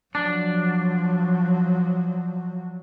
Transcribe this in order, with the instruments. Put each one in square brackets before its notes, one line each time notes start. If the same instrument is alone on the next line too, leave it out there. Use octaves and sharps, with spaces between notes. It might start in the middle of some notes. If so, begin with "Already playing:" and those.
[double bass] F3 F#3 [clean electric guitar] D4